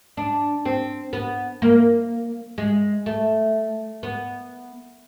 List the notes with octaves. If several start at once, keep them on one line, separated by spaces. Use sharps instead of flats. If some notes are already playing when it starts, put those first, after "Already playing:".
D4
C4
B3
A#3
G#3
A3
B3